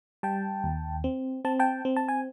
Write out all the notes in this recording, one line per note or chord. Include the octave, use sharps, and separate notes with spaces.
G3 G5 A5
D#2
C4
C4 A5
G5 A5
C4
A5
G#5